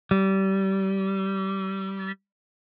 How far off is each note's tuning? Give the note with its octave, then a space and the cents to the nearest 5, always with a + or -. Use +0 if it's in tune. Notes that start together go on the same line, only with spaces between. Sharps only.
G3 -25